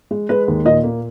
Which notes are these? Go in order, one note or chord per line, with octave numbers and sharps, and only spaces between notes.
G#3
G#3 B4
D#2
A#2 D#5
A#3